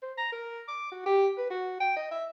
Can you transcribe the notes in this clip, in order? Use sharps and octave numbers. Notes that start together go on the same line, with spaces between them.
C5
A#5
A#4
D6
F#4
G4
B4
F#4
G5
D#5
E5